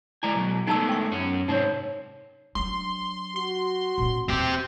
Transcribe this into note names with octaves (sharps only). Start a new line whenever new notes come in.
G#3 E4 D5 G#5
B2 F#3
G#3 A3 B3 D#4 A5 E6
G5 C#6
F#2 C#4
G#2 C3 C4 D#4 C#5
F#3 D4 C6
F#4 C6
A#2 C#4
D#2 E3 C4 G4